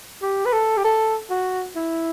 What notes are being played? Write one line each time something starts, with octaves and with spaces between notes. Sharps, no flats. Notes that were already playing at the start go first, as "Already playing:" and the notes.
G4
B4
A4
G4
A4
F#4
E4